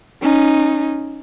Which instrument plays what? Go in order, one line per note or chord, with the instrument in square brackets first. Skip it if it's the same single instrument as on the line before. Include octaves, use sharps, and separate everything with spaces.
[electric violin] C#4 D#4